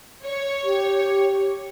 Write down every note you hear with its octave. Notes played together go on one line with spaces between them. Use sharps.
C#5
G4